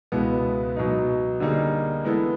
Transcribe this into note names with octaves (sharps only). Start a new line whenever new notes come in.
C#2 B2 G#3 B3 E4
B2 F#3 B3 D#4
D3 G3 A#3 D#4 G#4
E3 G#3 B3 E4 A4